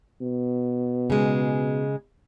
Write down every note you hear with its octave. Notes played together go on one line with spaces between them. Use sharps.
B2
C#3 G#3